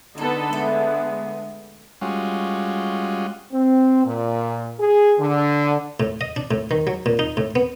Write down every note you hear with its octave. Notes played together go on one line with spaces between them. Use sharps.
D3 B3 D#4 G#4 A4 B4
G#3 A3
G3 G#3 C#4 F4 F#4
C4
A#2
G#4
D3
A2
D#5
D4
A2
D#3
F#3
A#2
D#4
A2
B3